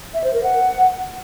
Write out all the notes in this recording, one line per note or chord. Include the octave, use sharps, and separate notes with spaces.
E5
C5
A#4
F#5